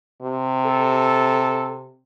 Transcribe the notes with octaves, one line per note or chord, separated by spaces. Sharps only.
C3
A4